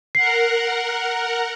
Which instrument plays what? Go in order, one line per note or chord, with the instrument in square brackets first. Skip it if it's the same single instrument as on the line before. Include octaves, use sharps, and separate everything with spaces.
[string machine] A#4 F#5 [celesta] C7